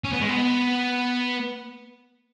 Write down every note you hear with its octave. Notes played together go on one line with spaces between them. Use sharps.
C#4
B3
G#3
B3